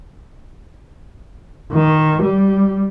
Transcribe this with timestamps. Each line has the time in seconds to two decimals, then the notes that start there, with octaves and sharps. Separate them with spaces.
1.74 D#3
2.23 G3